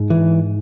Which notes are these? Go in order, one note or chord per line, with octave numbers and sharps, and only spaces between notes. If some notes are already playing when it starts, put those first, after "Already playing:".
Already playing: G#2
E3